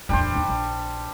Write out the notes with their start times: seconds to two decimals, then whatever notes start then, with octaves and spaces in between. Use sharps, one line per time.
0.09 D1 E2 G3 D4 C5
0.35 D#2 D#4
0.48 A#1